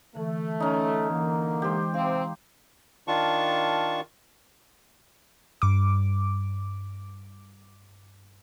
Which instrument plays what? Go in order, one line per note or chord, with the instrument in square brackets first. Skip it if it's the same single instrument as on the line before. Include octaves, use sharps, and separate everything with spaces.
[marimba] D3 E3 [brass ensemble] A3
[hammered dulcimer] C#4 D#4
[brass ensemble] D3 A#3 [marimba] E3
[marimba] E3 G#3 D#6 [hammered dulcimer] G4 C5
[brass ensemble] C3 C4 [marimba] F5
[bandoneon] D#3 D4 F4 A5 C#6
[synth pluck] G2 D6